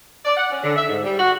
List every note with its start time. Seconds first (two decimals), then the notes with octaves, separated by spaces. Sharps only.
0.25 D5
0.36 F#5
0.50 C#4
0.63 D3
0.76 E5
0.88 G#2
1.03 G3
1.19 F#4